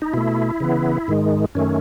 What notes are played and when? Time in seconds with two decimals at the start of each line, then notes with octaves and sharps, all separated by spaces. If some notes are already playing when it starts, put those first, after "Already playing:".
0.02 D#4
0.14 B2 A3 E4
0.60 C#3 E3 B3
1.08 G#2 D#3 G#3
1.55 F#2 D#3 A3 C#4